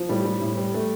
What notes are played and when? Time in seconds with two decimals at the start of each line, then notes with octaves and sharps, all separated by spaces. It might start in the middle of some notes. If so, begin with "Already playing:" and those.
Already playing: F3
0.09 A2 G3
0.25 G3
0.42 A2
0.58 G3
0.74 A3